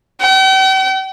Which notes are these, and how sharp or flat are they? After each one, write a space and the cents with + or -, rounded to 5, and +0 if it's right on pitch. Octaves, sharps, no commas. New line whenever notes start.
G5 -45